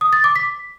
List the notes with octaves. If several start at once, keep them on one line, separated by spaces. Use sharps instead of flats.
D#6
A6
D6
B6